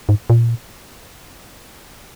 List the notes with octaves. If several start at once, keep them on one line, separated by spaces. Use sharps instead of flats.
G#2
A#2